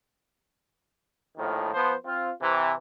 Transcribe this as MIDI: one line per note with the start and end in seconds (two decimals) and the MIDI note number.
1.38 1.73 34
1.38 1.73 45
1.38 1.73 51
1.38 1.73 53
1.74 1.95 53
1.74 1.95 59
1.74 1.95 72
2.05 2.31 60
2.05 2.31 65
2.42 2.74 48
2.42 2.74 52